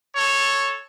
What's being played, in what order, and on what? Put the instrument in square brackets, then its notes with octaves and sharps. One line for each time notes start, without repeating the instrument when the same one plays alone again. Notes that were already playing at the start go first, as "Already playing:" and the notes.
[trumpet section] A4 C#5